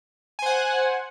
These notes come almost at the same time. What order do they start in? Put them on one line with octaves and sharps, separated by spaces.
G#5 C5 F#5